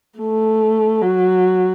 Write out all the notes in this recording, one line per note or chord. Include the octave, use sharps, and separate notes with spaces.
A3
F#3